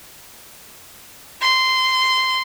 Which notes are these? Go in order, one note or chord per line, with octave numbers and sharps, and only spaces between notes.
C6